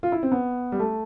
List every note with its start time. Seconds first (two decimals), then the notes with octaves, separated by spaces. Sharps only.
0.03 F4
0.12 E4
0.23 C4
0.32 B3
0.72 G3
0.79 A3